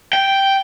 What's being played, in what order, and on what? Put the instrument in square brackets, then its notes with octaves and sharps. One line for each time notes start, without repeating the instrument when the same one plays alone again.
[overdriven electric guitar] G5